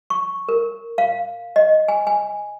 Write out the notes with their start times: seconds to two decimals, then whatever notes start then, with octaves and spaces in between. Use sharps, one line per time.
0.10 C#6
0.49 A#4
0.98 F5
1.56 D#5
1.88 G#5
2.07 G#5